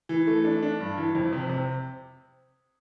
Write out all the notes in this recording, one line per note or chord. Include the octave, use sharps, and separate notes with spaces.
E3
A3
D4
D4
G2
E3
F2
C3
C3